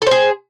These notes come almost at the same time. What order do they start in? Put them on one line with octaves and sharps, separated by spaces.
A4 C5 G#4